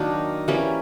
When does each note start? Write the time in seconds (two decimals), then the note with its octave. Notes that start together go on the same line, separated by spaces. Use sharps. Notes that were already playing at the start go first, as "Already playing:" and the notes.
Already playing: D#3 F#3 A#3 D4
0.48 E3 G3 A#3 C#4